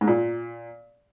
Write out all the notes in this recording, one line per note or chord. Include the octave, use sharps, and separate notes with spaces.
G#2
A#2